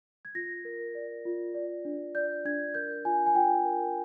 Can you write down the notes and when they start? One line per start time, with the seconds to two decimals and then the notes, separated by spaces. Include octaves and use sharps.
0.25 G#6
0.35 F4 A#6
0.65 A#4
0.95 D5
1.25 F4
1.54 D5
1.85 D4
2.15 D5 G6
2.45 D4 G#6
2.74 A#4 G6
3.05 F4 G#5
3.26 G#5
3.35 F4 G5
3.65 A#4